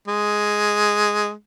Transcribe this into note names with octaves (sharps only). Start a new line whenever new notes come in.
G#3